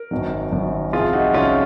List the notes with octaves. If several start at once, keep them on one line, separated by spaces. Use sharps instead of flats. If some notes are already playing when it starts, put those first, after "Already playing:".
Already playing: A#4
G#1 F#2 D#3 F#3
G#1 F#2 D#3 F#3
C2 C3 F3 F4 G#4
D#4 F#4
C2 C3 F3 C#4 F4